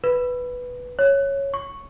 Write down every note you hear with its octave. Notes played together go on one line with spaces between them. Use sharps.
B4
C#5
C#6